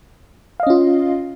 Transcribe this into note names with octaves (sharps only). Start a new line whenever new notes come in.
C#4 F4 D#5 F5